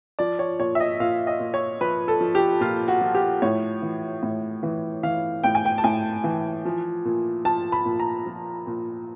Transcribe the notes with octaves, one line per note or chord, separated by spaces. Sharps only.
F3 D5
C#5
A#2 C#5
E5
D#5
A#2 F5
D#5
A#2
C#5
F3 B4
A4
F3
G4
A#2 F4
F#4
F3
G4
A2 C#5
E3
A2
E3
E3 F5
A2 G5
G#5
G5
A5
A2 G#5
E3
F3
A#2
F3 A5
B5
A#2
A#5
F3
A#2